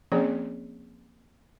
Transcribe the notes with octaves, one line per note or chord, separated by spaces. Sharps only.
F3 A#3 C4 C#4 G#4 C#5